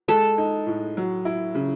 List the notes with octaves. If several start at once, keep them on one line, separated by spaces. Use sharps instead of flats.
G#3 A4
D#4
A2
F#3
E4
C#3